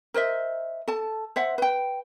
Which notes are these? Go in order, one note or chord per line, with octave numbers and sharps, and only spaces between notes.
A#4 C5 D#5 E5
A4 A5
C5 E5 F#5
B4 G5